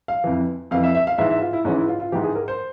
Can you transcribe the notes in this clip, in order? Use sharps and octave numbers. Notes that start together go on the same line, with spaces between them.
F5
F2 E3
F2 E3 F5
E5
E5
F5
G#2 E3 E5
E5
F4
E4
G#2 E3 C#4
E4
F4
F4
G#2 E3 G4
G#4
A#4
C5